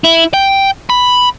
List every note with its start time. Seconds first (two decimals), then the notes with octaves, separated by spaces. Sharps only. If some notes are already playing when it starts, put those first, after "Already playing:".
0.04 E4
0.34 G5
0.90 B5